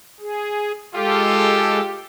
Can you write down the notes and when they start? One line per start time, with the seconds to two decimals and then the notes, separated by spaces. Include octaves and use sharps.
0.20 G#4
0.95 G#3 F4 G4 A4